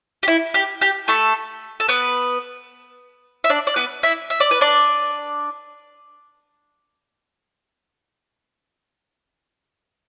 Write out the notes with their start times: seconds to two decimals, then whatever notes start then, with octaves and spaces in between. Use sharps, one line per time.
0.23 G4
0.28 E4
0.54 G4
0.81 G4
1.08 A3 A4
1.80 A4
1.88 B3 B4
3.44 E5
3.50 D4 D5
3.67 D5
3.76 B3 B4
4.03 E4 E5
4.30 E5
4.40 D5
4.51 B4
4.61 D4 D5